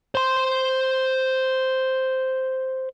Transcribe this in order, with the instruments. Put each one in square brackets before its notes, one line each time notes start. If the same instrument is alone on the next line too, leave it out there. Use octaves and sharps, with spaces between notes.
[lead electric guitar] C5 C6